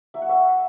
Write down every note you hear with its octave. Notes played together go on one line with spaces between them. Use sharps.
F#3 E5
F#5
C#5 E5